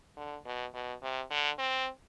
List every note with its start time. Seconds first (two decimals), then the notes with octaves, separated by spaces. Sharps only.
0.17 D3
0.45 B2
0.74 B2
1.02 C3
1.31 D3
1.59 C4